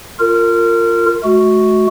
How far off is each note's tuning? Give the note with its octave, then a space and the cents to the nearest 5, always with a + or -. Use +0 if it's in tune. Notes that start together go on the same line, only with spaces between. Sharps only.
F4 +0 A#4 -25
A3 -40 F#4 +0